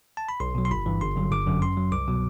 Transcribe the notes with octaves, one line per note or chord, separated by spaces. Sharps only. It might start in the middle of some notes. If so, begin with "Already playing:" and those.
A5
B5
B1 C6
B2 F#3
C6
G1 B5
G2 E3
G1 C6
G2 D3 F#3
G1 D6
F#2 D3 F#3
F#2 C6
F#3
C2 D6
B2 F#3